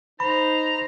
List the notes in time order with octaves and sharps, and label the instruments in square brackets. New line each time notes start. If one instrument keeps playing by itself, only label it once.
[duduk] D#4 [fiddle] C5 [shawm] A#5 [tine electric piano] B5